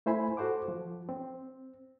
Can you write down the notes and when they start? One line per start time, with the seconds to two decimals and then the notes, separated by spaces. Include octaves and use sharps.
0.06 A3 E4 C5 G#5 B5
0.37 F#4 A4 C5 F#5 D6
0.68 F3
1.09 C4